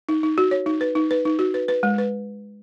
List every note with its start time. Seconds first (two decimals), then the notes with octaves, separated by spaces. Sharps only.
0.09 D#4
0.23 D#4
0.38 F#4
0.51 C#5
0.66 D#4
0.81 B4
0.95 D#4
1.11 B4
1.25 D#4
1.39 F#4
1.54 B4
1.68 B4
1.83 G#3
1.98 B4